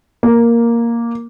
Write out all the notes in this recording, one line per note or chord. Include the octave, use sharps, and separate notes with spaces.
A#3